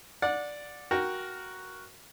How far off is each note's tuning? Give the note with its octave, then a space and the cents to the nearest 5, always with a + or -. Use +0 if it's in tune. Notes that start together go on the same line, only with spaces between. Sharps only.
D5 +0 F#5 -25
F#4 +0 A#4 +10 G5 +0